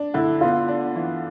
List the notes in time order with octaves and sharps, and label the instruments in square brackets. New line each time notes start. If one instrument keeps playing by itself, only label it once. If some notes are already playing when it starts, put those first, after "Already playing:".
Already playing: [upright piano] D4
[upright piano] D3 [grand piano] E4
[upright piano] B3 [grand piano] F4
[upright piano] D4
E3